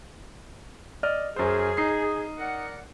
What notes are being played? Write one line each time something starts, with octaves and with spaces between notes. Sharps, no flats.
D5 D#5 F6
F#2 G#4 C5
D#4 C7
A#4 D5 F#5